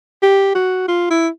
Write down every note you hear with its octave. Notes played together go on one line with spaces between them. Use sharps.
G4
F#4
F4
E4